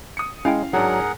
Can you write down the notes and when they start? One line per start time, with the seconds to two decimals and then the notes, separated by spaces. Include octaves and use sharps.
0.17 D#6 C#7
0.45 G#3 C#4 E4 F5 G5
0.73 G#2 F#3 D4 G#4 A#4 F#5